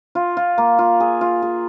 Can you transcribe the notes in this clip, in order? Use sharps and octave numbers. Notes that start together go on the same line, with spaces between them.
F4
F4
A#3
F4
G#4
F4
G#4